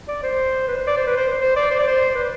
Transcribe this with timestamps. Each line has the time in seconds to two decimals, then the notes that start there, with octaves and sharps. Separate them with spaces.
0.08 D5
0.23 C5
0.68 B4
0.77 C5
0.87 D5
0.97 C5
1.07 B4
1.16 C5
1.41 C5
1.56 D5
1.71 C5
1.79 D5
1.88 C5
2.15 B4